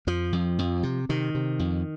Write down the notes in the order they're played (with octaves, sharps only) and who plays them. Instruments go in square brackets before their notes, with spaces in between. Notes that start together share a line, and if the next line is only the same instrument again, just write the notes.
[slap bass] F2 F3
F2
F2
C3
C3 D#3
C3
F2